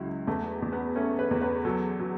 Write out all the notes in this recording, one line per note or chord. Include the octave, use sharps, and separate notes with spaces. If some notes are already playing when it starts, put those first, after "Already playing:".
Already playing: C#2 C#3 F#3 E4
E2 A3
E2
B3
A3 C#4
B4
E2
B4
F#3 A4
F#3